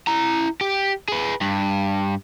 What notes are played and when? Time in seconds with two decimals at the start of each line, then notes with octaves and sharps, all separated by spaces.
0.07 E4 A#5
0.61 G4
1.08 G#4 B4
1.41 G2